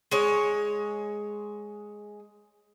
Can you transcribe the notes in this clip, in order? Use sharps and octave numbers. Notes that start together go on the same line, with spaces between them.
G#3 C#5